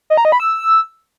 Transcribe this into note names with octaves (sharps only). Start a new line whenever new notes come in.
D#5
A#5
D#5
B5
E6